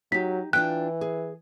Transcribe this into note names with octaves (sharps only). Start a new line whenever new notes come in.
F#3 D#4 G4 B6
E3 D4 F4 G5 F#6
G#4